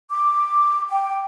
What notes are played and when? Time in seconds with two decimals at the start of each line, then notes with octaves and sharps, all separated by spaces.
0.11 D6
0.90 G5